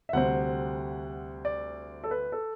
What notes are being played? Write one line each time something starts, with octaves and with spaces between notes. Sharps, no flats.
E5
D2 C3 G3 C4 F#5
D5
A4
B4
A4